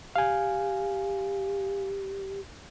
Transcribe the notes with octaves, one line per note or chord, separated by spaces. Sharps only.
G4 F5 G#5